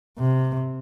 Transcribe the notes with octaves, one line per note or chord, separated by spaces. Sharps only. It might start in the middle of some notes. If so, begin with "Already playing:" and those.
C3